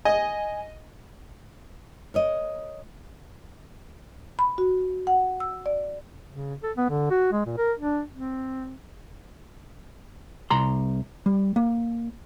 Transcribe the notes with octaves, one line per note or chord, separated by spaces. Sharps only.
D#5 G#5
A#4 C#5 D#5
B5
F#4
F#5
E6
D5
C#3
A4
B3
D3
F#4
G#3
A#2
A#4
D4
C4
C2 A#5 C6
G3
A#3